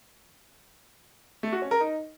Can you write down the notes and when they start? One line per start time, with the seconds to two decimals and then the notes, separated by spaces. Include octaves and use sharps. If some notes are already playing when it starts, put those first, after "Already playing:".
1.43 A3
1.53 F#4
1.62 C#4
1.71 A#4
1.81 D#4